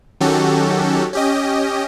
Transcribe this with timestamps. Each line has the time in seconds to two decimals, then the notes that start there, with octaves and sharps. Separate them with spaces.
0.20 D#3 F#3 C#4 F#4 G4 A4
1.13 C#4 G4 D#5